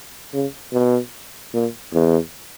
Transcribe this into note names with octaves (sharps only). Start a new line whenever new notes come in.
C#3
B2
A#2
E2